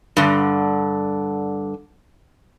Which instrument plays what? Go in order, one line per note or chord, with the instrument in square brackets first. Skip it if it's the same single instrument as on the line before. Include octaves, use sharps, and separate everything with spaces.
[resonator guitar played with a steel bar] G2 D3